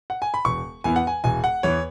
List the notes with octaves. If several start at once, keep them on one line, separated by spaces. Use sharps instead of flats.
F#5
G#5
B5
E1 C#6
E2 E3 B3 G#5
F#5
G#5
E1 G#5
F#5
E2 E3 B3 C#5